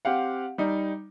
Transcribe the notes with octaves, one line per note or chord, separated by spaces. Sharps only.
C4 G4 F5 F#5
G3 D#4